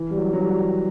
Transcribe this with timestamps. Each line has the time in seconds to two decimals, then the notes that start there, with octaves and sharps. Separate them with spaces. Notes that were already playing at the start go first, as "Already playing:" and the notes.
Already playing: E3
0.11 G3
0.17 F#3
0.33 F#3
0.39 G3